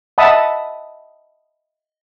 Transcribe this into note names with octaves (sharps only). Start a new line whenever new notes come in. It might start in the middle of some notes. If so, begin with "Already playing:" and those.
D#5 E5 F#5 A5 B5 D#6